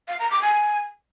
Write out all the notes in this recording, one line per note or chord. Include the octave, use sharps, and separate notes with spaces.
F5
A#5
D6
G#5